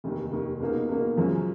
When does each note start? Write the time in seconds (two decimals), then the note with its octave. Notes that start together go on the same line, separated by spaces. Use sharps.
0.04 F1 D#2 D#3
0.32 F1 D#2 D#3
0.60 C#2 B2 A#3 D#4
0.89 C#2 B2 A#3 D#4
1.17 F#2 C#3 F3 G#3 C#4